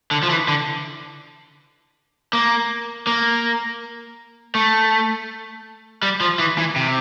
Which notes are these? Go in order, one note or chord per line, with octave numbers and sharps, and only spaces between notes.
D3
F3
E3
D3
A#3
A#3
A3
G3
F3
E3
E3
C3